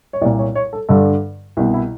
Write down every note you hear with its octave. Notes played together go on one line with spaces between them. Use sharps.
C#5
C2 A#2 D5
C#5
C#5
A4
G2 D3 A4
C2 B2
E4